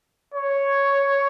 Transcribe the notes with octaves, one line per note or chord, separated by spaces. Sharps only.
C#5